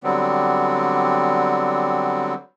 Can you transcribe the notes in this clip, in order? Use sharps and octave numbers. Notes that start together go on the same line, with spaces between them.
D3 F#3 G3 B3 C4